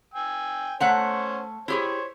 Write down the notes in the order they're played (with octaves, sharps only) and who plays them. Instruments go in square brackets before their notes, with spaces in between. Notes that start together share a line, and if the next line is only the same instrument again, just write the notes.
[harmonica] G5 G#5 E6
[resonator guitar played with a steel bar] A3 F#5 A#5 [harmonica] C#4 C5 C#5
[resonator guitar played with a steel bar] E4 G4 G#4 [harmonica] C5 C#5